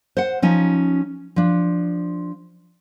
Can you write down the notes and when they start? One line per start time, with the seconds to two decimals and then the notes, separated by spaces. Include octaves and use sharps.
0.17 C5 F#5
0.42 F3 C#4 D#4
1.36 F3 D4